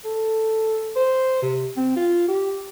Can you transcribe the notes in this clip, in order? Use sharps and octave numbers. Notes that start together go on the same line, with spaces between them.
A4
C5
C3
C4
F4
G4